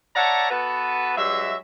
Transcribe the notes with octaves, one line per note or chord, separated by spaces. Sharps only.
C#5 D5 E5 F#5 A5 A#5
B3 F#4 A4 B4
G2 F#3 G#3 E5